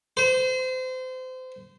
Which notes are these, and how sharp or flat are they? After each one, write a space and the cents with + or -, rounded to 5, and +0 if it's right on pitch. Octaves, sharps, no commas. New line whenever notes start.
C5 -30